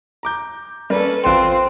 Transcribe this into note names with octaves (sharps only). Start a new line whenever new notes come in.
A#5 D6 G6
G3 A#3 C#4 A4 B4
A1 C4 F4 A4 G5 C6 F#6 E7